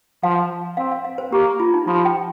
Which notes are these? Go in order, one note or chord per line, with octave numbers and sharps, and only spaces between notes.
F3 F5
C4 F5
F5
F5
C5
A#3 G4
F4
D#4
F3 F4
G5